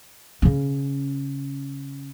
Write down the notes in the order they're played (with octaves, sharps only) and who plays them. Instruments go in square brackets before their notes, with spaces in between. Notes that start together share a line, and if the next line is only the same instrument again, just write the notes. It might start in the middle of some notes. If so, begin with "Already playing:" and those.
[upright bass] C#3 C#4